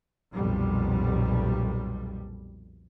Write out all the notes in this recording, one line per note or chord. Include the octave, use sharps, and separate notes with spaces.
B1 F2 A#2 G3